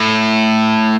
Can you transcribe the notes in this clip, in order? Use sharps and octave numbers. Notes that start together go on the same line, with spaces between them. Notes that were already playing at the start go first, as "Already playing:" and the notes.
Already playing: A2